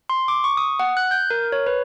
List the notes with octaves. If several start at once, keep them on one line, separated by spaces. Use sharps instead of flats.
C6
D6
C#6
D#6
F#5
F#6
G6
A#4
C#5
B4